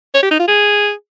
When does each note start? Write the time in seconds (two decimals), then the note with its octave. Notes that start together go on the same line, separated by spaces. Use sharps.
0.14 C#5
0.23 G4
0.31 D#4
0.39 F4
0.48 G#4